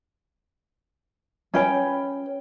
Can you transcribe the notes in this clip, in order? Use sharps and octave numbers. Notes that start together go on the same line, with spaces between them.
C#4 B4 G5